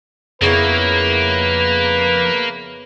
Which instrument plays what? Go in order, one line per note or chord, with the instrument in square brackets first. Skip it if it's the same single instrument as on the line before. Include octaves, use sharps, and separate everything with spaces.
[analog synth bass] F2 [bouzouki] C#3 B3 E4 [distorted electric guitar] A#3 [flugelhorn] B4